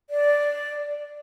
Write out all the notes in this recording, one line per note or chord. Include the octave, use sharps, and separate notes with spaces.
D5